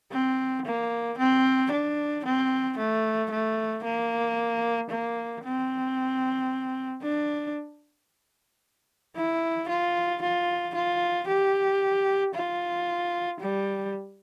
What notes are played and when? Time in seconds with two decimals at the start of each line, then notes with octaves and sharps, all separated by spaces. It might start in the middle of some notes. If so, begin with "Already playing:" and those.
0.12 C4
0.66 A#3
1.18 C4
1.72 D4
2.25 C4
2.78 A3
3.31 A3
3.84 A#3
4.90 A#3
5.44 C4
7.03 D4
9.17 E4
9.69 F4
10.22 F4
10.75 F4
11.28 G4
12.34 F4
13.41 G3